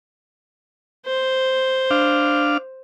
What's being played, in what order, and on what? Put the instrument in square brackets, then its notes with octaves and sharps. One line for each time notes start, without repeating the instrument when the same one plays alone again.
[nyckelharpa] C5
[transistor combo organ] D4 F5